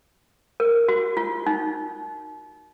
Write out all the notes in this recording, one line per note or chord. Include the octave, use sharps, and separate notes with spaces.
A#4
F#4
F4
D#4